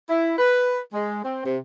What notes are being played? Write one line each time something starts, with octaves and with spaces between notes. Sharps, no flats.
E4
B4
G#3
C4
C3